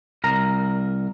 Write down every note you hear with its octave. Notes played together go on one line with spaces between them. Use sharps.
C2 A#4 A#5